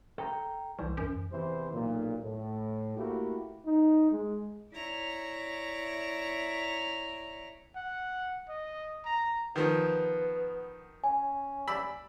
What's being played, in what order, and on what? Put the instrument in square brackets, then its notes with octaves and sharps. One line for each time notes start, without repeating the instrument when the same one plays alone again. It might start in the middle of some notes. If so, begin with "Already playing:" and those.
[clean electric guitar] A4 G5 A#5
[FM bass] C2 [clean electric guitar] E3 C5
[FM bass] F#2
[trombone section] E2 C3 E3 C5
B1 A#2
A2
A3 A#3 E4 F#4 G4
[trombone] D#4
G#3
[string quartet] E4 C#5 D5 A#5
[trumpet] F#5
D#5
A#5
[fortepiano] D#3 F3 [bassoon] B3
[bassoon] C#4 [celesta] G#5
[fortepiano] D5 B5 E6